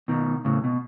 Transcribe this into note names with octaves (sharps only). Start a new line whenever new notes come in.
B2 D#3
A2 C#3
B2